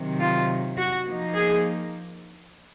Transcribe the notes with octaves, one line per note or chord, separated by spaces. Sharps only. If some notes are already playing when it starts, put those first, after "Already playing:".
Already playing: C3 D#3 F#3
F4
F#4
F3 A#3 D#4
G#4